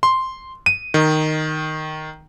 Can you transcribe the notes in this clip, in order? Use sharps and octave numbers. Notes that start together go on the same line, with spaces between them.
C6
D#7
D#3